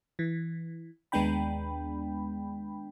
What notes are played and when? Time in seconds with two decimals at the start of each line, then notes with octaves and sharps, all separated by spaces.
0.19 E3
1.12 D#2 G#3 B3 D4 G5 B5